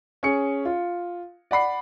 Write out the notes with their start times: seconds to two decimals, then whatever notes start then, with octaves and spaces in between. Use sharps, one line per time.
0.23 C#4 G#4 C#7
0.65 F4
1.51 D5 F#5 B5 C7